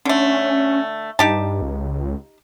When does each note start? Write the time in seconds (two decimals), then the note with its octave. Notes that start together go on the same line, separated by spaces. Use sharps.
0.05 D3 A3 C#4
1.19 G2 D#4 G4 A5
1.62 C#2